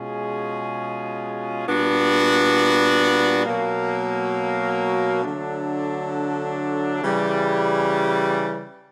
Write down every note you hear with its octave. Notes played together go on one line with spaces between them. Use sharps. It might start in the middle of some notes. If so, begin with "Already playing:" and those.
Already playing: B2 G#3 C#4 F4 G#4
A#2 G3 B3 D4 F#4
B2 F#3 A#3
D3 F#3 A3 D4
C#3 E3 G3